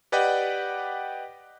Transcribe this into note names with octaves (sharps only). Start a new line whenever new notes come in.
G4 B4 D5 D#5 F#5 G5